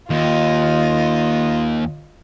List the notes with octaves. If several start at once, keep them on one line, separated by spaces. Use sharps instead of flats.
D#2 F4 D#5